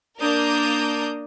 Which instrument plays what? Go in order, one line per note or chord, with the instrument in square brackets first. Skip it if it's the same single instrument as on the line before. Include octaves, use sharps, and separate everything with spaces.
[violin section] A#3 D4 A#4 D#6 G6